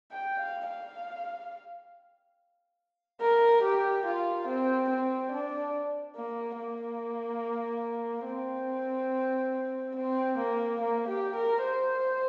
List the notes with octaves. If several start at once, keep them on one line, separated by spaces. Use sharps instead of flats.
G5
F5
F5
A#4
G4
F4
C4
C4
D4
A#3
A#3
C4
C4
A#3
A#3
G4
A#4
C5